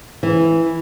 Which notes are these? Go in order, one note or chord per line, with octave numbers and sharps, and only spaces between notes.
E3